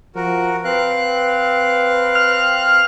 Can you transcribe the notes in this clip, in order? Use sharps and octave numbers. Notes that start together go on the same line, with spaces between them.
F3 F#4 A#4
C4 B4 F5 F#6
F6